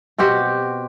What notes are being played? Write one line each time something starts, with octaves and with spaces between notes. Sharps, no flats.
B2 C4 F#4 G4